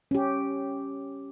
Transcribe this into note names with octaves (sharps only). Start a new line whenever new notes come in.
C#4 G4